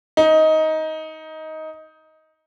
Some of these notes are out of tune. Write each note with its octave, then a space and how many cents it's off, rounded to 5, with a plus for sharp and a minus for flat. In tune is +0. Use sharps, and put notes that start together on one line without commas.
D#4 +15